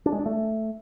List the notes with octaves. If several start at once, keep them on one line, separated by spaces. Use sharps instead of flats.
D4
G#3
D4
A3